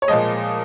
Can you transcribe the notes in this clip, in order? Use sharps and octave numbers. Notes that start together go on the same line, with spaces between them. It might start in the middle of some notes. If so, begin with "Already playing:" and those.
C#5
A#2 F3 G#3 D#5